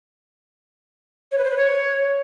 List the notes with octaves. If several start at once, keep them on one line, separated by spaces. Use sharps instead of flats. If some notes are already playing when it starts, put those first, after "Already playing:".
C#5
B4
C5
B4
C#5